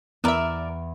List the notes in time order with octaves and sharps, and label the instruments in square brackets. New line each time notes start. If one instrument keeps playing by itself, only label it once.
[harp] E2 B5 D#7 [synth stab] B3 E5 [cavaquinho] A#4 D5